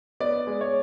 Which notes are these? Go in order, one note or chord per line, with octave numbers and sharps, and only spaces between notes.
B3 D5
G#3
C#5